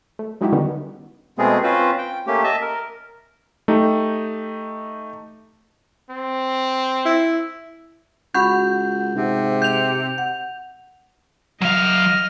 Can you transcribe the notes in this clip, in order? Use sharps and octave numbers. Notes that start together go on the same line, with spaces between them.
A3
F#3 G#3 D#4 E4 F#4 G4
D3 D#3 G3 B3 C#4 D#4
B2 G#3 A3 B3 C4 G#4
C4 C#4 F4 B4 C5
G5
A3 A#3 C#4 G4
D#5 E5 A5
A#4
A3 D#4 G4
C4
E4
C#2 F#4 F#5 B5 C#6 G6
G#2 C3
G6 F7
F#5
F#3 D#5 F5 F6